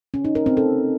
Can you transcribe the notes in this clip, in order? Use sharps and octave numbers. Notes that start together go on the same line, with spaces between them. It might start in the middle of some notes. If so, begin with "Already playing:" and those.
C#4
D#4
A#4
C4
A4